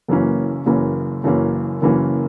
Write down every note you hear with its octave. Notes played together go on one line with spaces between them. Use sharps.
F#1 F#2 E3 A#3 C#4
F#1 F#2 E3 A#3 C#4
F#1 F#2 E3 A#3 C#4
F#1 F#2 E3 A#3 C#4